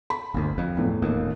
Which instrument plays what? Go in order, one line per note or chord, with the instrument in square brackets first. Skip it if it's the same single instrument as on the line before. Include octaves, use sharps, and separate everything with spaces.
[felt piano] B5
[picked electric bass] G1 D2
F2
[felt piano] E2 A2
[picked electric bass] D#1 D#2